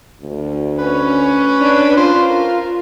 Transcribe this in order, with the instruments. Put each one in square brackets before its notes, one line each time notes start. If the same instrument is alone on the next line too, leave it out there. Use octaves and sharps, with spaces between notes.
[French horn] D2
[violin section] C#4 [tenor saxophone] B4
[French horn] D4
[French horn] F4 [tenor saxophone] C5
[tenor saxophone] A#4